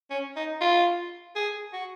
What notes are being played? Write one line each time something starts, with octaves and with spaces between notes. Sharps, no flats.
C#4
D#4
F4
G#4
F#4